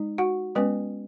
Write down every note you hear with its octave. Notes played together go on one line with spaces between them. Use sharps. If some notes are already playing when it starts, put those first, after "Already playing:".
Already playing: G#3 D#4
F#4 F#5
G#3 B3 C#4 B4